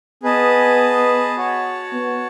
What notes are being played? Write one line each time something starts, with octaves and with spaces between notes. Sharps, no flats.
B3 G#4 B4 D#5 A5
F#4 C#5 F#5 A5
B3